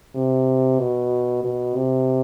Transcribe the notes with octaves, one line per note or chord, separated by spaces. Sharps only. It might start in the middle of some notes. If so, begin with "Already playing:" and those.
C3
B2
B2
C3